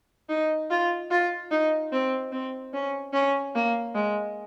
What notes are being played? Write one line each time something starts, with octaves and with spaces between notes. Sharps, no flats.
D#4
F4
F4
D#4
C4
C4
C#4
C#4
A#3
G#3